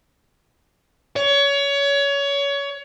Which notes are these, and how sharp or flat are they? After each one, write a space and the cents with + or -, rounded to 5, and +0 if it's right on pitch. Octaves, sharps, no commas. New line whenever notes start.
C#5 +25